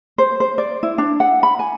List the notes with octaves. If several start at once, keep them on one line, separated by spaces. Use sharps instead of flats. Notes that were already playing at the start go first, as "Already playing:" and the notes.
C5
C5
D5
E4
D4
F#5
B5
G#5